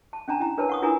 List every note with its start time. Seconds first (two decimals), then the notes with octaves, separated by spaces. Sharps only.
0.13 A5
0.28 C#4 D4 A5 A#5
0.40 E4 G5 A#5
0.57 D4 A#4 B4 C#5 A5
0.69 F#5 C#6 D#6
0.82 D4 E4 F4 A#4 G#5 A#5